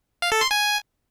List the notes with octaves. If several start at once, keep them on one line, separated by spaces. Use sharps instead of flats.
F5
A4
C6
G#5